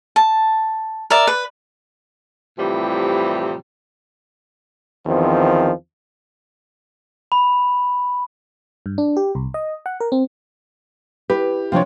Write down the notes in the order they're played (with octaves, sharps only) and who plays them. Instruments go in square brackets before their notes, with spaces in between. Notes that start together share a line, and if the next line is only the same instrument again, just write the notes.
[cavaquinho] A5
A#4 D5 E5
B4
[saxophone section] A2 C3 E3 F3 G3
[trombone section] E2 D#3 F3 C4
[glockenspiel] B5
[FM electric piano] G2
D4
G4
C2
D#5
F#5
A#4
C4
[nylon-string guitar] E4 B4 [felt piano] G4
[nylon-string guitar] C3 F3 D4 [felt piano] C#5 F5